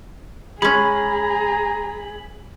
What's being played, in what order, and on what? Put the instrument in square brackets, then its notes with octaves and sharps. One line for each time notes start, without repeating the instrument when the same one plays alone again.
[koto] G#3 C#4 [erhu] G#4 [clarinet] A#5 [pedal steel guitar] B5